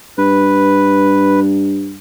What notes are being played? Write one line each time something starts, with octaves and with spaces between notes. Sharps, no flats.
G2 B4